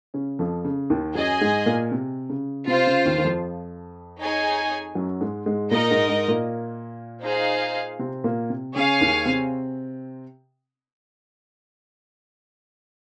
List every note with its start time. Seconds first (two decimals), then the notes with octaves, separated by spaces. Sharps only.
0.14 C#3 C#4
0.39 F2 F3
0.65 C#3
0.90 D#2 D#3
1.15 F#2 F#3 G#4 D#5 G#5
1.41 G#2 G#3
1.66 A#2 A#3
1.92 C3
2.30 C#3
2.67 C3 F4 C5 F5
2.87 C#3
3.05 D#2 D#3
3.18 D#3
3.24 F2 F3
4.19 D#4 G#4 C#5 G#5
4.95 F#2 F#3
5.21 G#2 G#3
5.46 G#2 G#3
5.71 A#2 A#3 D#4 A#4 D#5
5.90 G#2 G#3
6.09 G#2 G#3
6.28 A#2 A#3
7.23 D#4 G#4 C5 F5
7.99 C3 C4
8.24 A#2 A#3
8.50 C3
8.75 C#3 G#4 C#5 F5 G#5
9.01 D#2 D#3
9.25 C3 C4